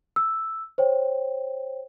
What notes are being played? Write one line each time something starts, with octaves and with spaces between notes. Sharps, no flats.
E6
C5 C#5 G5